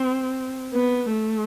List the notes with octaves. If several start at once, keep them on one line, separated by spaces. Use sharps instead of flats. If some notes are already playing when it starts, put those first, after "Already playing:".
Already playing: C4
B3
A3